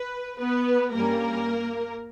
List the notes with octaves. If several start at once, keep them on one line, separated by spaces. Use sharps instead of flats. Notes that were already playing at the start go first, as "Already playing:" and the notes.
Already playing: B4
B3 B4
G2 G3 A#3 C#4 A#4